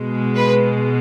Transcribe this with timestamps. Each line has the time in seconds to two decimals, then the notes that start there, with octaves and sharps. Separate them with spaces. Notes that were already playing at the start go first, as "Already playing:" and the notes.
Already playing: B2 G#3
0.36 B4